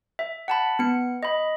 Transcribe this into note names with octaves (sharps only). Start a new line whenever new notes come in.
E5
F#5 A5 B5
B3 C#7
D#5 B5